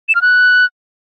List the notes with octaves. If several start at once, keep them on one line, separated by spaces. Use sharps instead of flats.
E7
F6
F#6